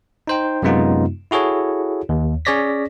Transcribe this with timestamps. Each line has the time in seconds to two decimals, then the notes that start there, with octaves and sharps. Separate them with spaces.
0.27 D#4 C5 G5
0.63 F#2 C3 G#3 B3 D#4 F4
1.31 E4 F#4 G#4 A4 C#5
2.09 D#2
2.45 C#4 G#4 C#5 D5 A#6 B6